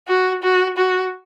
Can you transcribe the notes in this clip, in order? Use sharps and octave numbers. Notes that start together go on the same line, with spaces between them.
F#4
F#4
F#4